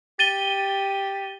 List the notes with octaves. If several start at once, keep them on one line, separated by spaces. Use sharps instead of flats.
G4 A6 D#7 G7